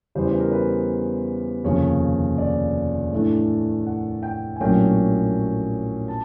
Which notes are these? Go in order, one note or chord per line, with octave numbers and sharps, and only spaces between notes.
E2 C#3 E3 G3 B3 C5
B4
A#4
B4
F1 D#2 C#3 F3 C#5
D5
A2 E3 A3 D4
F#5
G5
G#5
A#1 A2 F#3 A#3 C#4 G5
A5